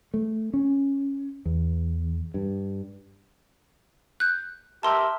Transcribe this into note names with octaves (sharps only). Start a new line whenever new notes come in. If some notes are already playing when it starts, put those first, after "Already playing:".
A3
C#4
E2
G2
F#6 G6
G4 A#4 E5 A5 C6 E6